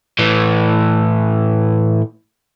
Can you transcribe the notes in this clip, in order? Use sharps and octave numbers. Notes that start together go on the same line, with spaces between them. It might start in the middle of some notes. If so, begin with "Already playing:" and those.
A2 E3